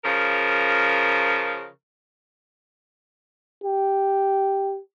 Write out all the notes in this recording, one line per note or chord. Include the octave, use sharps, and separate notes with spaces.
C#3 F3 A#4
G4